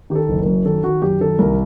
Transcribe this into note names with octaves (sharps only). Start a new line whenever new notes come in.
D#3 G4
A4
F#1
A#4
F#2
D#3 A4
D#3 F#4
F#2 G4
D#3 A4
C2 A#4